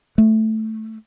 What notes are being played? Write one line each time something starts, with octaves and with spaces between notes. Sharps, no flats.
A3